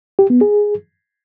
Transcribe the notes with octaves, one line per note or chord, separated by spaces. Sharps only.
G4
B3
G#4